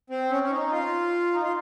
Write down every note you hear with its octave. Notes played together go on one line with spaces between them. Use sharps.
C4
C#4
C#4
D#4
F4
D#4
F4